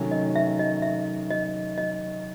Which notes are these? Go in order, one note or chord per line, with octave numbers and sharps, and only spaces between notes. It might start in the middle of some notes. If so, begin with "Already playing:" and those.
Already playing: C3 D#3 F#3 A3 C#4
D#5
E5
D#5
E5
D#5
D#5